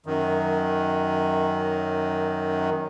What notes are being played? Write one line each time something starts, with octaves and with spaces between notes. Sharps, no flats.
F#2 D#3